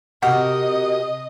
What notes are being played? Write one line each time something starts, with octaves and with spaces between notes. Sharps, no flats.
C3 F#4 G4 A#4 D#5 F#5